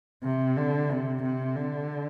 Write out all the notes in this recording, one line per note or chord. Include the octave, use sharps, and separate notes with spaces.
C3
D3
C3
C3
D3